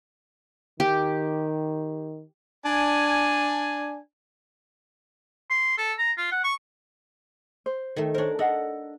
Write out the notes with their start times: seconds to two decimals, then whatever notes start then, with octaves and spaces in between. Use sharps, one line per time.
0.80 D#3 G4
2.65 D4 G#5
5.50 C6
5.78 A4
5.98 A#5
6.17 F4
6.32 F#5
6.44 C#6
7.66 C5
7.96 D#3 A3
8.14 D4 A#4 C5 C#5
8.39 D4 A4 D#5 F#5